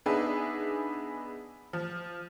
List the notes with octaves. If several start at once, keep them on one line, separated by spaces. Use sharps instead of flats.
B3 D4 D#4 G#4 B4 E5
F3